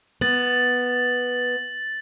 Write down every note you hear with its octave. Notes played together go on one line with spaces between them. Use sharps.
B3 A6 F#7